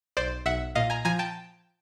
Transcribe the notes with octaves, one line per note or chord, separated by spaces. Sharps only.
B1 C5 D5
B1 E5 F#5
A#2 D#5 F5
G#5 A#5
F3 G#5 A#5
G5 A5